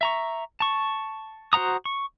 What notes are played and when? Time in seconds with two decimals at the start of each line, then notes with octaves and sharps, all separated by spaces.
0.01 E5 A#5 C#6
0.60 A5 C#6
1.53 F#4 C5 F#5 A#5 D#6
1.85 C#6